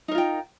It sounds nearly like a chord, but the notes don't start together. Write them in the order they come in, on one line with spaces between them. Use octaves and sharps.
D#4 A#4 F4 G5